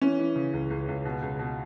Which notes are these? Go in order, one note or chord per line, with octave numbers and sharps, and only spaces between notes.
E3 C#4
E3
C#3
C#2
C#2
C#2
B2
C#2
B2